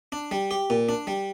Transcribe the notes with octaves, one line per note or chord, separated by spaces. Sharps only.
D4
G3
G4
A#2
D4
G3